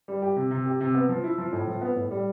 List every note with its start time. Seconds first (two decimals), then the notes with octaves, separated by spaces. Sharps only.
0.08 G3
0.22 G4
0.36 C3
0.51 C3
0.66 G4
0.80 C3
0.95 B3
1.09 F3
1.24 E4
1.38 F3
1.53 A2
1.67 F3
1.81 B3
1.96 A2
2.11 G3